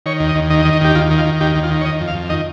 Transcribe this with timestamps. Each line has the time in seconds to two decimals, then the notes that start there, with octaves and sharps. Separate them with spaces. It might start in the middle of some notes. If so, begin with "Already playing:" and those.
0.06 D#3 C#5
0.20 D#2
0.29 D#5
0.35 D#2
0.50 D#3 D#5
0.62 D#5
0.65 D#3
0.73 D#5
0.81 D#2 G4
0.95 D#2 F4
1.11 D#3
1.18 F4
1.25 D#3
1.41 D#2 G4
1.55 D#2
1.63 F4
1.71 D#3
1.81 C#5
1.85 D#3 D#5
2.01 F2
2.08 F5
2.15 F2
2.29 D#3 D#5